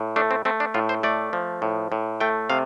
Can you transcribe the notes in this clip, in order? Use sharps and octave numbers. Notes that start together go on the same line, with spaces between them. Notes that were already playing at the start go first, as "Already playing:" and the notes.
Already playing: A2
A3 D4
C4
A3 C4
D4
A2 F4
C5
A3 D5
F3
A2
A2
A3 G5
C3 F5